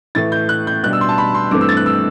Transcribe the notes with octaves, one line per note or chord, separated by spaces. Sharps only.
A2 E3 A3 A6
G6
F#6
G6
B2 G3 D4 F#6
E6
C6
A5
B5
C6
G2 E3 A3 C4 D6
E6
A6
F#6
E6